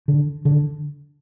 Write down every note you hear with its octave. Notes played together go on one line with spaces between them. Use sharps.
D3
D3